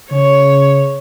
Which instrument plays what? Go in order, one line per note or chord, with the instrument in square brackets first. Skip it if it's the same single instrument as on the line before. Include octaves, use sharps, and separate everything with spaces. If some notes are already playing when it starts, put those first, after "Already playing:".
[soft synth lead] C#3 [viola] C#5